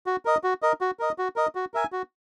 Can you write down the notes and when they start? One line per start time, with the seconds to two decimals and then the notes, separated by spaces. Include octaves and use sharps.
0.06 F#4
0.25 A#4 D#5
0.44 F#4
0.62 A#4 D#5
0.81 F#4
0.99 A#4 D#5
1.18 F#4
1.36 A#4 D#5
1.55 F#4
1.74 A#4 E5 G#5
1.92 F#4